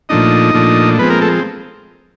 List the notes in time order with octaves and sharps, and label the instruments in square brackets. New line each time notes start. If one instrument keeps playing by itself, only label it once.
[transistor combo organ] A#2 F3 A3 D4 D#4 D#5
A#2 F3 A3 D4
F3 G#3 B3 C4 B4
A#3 A#4
A3 A4